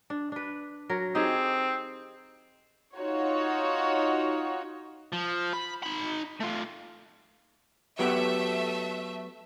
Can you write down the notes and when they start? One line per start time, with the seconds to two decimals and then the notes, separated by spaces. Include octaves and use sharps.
0.10 D4
0.32 D4 B4
0.89 F#3 A#4
1.15 C4 D#4 G4 G#4
2.96 D#4 F4 F#4 C#5
5.12 F3
5.53 B5
5.83 D#4 B5
6.41 A3 F4
7.99 F#3 A3 B3 G4 E5